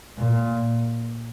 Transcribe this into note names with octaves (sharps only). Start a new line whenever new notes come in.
A#2